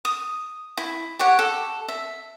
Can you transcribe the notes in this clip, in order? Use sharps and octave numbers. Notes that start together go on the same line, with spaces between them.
D#6
E4
G4 C#5 F#5
A4
E5